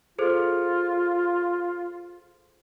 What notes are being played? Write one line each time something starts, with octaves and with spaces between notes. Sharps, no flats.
F4 G#4 A4 C5